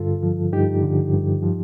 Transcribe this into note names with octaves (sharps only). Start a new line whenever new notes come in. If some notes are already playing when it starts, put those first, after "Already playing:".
Already playing: G2 D3 F4 A4
F3
G2 D#4 G4
D3
G2
F3